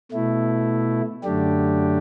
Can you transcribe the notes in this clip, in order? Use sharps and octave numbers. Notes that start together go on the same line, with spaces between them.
B2 A3 E4
F#2 D3 A3 D4 G4